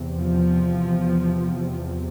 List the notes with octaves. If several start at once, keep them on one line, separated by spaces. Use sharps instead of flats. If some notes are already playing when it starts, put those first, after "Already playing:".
Already playing: E2 C3
F3